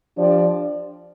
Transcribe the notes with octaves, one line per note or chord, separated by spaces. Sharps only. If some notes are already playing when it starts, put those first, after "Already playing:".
F3 D4 G4 D5